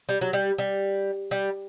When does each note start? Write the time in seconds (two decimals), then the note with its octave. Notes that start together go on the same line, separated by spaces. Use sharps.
0.09 G3
0.21 F#3
0.33 G3
0.58 G3
1.31 G3